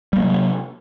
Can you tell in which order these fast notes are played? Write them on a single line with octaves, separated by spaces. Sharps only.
G3 A#3 F#3 C3